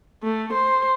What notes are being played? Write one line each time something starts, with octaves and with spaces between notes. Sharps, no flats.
A3
C5